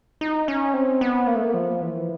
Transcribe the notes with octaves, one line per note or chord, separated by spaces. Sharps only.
D#4
C#4
C4
B3
A#3
A3
A#3
F3
E3